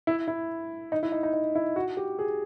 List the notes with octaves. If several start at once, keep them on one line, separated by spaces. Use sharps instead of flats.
E4
E4
D#4
E4
D#4
D#4
D#4
E4
F#4
G4
G#4